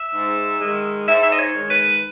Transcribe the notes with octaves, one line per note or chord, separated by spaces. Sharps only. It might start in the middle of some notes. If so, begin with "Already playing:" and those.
Already playing: E5
G#2
D#3 G#3
G#2 E5
E5
D#5
C#5
D#3 G#3
B4